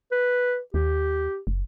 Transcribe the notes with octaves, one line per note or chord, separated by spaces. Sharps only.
B4
D#2 G4
F#1